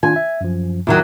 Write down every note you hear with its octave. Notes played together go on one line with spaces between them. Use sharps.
D#3 D4 F4 G#5
E5
F#2 F3
E2 D#3 F#3